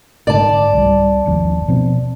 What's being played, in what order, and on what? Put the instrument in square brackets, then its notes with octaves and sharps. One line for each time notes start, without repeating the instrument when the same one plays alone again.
[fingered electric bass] G1 G#2 D3 [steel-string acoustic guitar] D5 A5
[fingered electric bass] C2 G3
G1 D#2 F3
B2 F3 C4